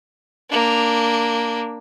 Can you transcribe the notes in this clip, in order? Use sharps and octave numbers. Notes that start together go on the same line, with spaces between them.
A#3 D4